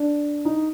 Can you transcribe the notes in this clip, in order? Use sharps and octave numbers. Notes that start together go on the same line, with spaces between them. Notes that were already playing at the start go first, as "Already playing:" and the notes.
Already playing: D4
D#4